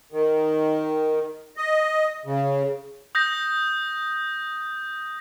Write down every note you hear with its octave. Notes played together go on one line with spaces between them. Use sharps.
D#3
D#5
C#3
D#6 G6 A#6